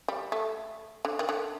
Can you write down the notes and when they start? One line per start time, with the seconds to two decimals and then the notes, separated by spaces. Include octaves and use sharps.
0.08 G3
0.32 A3
1.05 D3
1.19 D#3
1.29 D3